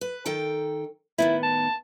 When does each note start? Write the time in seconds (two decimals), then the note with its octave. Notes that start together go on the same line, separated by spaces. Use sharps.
0.01 B4
0.26 D#3 A4 G5
1.18 A2 D#3 B3 E4
1.43 A5